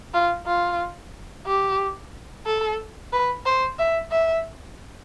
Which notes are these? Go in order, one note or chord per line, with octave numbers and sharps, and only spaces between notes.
F4
F4
G4
A4
B4
C5
E5
E5